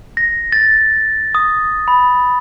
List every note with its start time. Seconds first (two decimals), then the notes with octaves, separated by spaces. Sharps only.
0.17 A#6
0.52 A6
1.35 D#6
1.88 B5